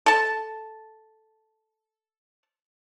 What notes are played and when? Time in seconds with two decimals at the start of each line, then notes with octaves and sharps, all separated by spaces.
0.06 A4 A5